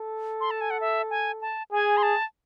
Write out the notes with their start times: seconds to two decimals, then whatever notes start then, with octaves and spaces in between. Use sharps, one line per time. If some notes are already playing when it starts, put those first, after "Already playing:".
Already playing: A4
0.41 C6
0.51 A5
0.61 G#5
0.70 F#5
0.81 E5
1.10 G#5
1.41 A5
1.72 G#4 G#5
1.97 C6
2.03 A5